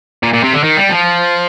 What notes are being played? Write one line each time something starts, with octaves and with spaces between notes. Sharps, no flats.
A#2
A#2
C3
D3
D#3
G3
F3